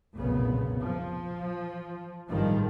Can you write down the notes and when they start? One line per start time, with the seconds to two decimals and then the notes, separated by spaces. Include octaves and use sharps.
0.16 F1 B1 A#2 C#3 B3
0.83 F3
2.30 A1 G2 D#3 F3 G3 G#3